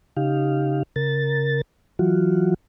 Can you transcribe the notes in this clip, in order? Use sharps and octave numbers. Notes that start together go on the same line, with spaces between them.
C#3 D#4 G4 F5
C#3 A#4 A6
E3 F#3 F4 F#4